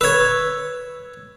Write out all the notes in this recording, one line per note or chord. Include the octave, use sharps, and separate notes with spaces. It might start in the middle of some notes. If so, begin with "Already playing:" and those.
B4 C#5 E6 G#6